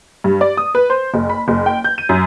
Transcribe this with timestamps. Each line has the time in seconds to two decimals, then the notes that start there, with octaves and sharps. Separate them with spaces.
0.24 G2
0.41 D5
0.57 D#6
0.75 B4
0.90 C5
1.14 F#1
1.30 B5
1.48 F#1
1.66 G5
1.84 G6
1.98 D#7
2.09 F#2